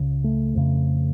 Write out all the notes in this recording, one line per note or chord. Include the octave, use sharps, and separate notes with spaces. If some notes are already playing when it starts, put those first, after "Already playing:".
Already playing: C#2 C#3
A3
F2 C#3